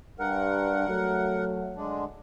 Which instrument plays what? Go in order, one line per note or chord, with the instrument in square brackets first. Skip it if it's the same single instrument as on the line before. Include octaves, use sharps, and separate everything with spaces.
[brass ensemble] G2 [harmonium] A#4 F#5
[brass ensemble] F#3 A3
[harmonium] D3 G#3 D4